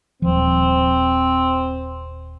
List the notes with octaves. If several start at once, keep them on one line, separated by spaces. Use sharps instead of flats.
D#1 F3 C4